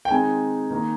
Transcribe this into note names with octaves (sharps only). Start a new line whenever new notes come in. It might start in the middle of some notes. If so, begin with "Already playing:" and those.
G5
D#3 G#3 C4 D#4 G#5
D#3 A#3 D#4